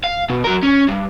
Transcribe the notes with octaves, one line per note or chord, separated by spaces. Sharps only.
F5
B2
F#3 A#4
C#4
G2